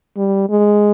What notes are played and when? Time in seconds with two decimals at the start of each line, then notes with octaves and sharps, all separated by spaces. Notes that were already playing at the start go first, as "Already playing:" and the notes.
0.17 G3
0.50 G#3